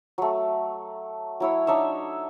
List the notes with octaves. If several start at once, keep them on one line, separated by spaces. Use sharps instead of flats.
F#3 A3
F#3 E4 C#5
D4 D#4 C#5 E5